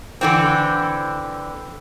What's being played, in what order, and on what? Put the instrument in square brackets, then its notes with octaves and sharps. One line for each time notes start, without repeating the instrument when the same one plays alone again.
[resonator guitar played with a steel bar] D3 E3 C4